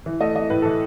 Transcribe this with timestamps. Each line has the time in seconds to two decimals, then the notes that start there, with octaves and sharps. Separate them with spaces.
0.06 E3
0.20 A3 D#5
0.35 E3 D#5
0.50 A2 B4
0.62 E3 A4